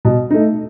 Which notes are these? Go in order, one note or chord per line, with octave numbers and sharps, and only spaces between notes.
B2
A3 D#4